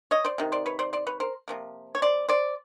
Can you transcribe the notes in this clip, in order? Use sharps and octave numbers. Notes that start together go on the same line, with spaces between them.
C#5 D#5
C5 D5
C3 D#3
C5 D5
B4 C#5
C5 D5
C5 D5
B4 C#5
A#4 C5
C3 F3 A#3
C#5
C5 D5
C5 D5